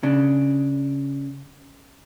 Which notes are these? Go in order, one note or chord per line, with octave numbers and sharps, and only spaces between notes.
C#3 D4